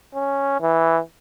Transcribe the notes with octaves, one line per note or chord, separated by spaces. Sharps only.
C#4
E3